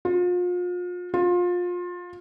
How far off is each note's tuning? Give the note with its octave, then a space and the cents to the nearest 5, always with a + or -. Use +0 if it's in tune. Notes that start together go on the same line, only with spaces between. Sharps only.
F4 +35
F4 +25